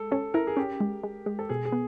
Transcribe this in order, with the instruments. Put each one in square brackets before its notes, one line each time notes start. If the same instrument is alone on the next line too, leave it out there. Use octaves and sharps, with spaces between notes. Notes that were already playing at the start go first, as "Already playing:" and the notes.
Already playing: [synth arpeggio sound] G#3 [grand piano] A4
[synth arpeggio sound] C#4 [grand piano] A4
[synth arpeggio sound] E4 [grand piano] A#4
[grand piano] G#4
[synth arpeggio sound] C#4 [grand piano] G4
[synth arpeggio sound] G#3
G#3
G#3
[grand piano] A4
[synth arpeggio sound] B2 [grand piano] G#4
[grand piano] G#4
[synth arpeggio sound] B3